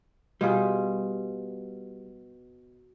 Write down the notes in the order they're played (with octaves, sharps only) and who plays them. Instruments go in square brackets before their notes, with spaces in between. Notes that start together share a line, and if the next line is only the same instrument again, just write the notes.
[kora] B2 F4 G#4 [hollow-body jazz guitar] G3